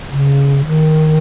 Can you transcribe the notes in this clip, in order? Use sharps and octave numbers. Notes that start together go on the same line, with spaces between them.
C#3
D#3